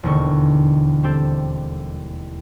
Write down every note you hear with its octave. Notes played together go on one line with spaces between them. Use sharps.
E1 D#2 D3 C#6
G3 C4 G4 A4